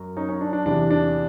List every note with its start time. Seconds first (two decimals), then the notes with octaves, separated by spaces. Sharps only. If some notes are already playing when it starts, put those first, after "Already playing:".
Already playing: F#2 F#3
0.17 C#4 D#4
0.29 C#4
0.41 D4
0.53 D4
0.65 E2 C3 E3 D4
0.91 D4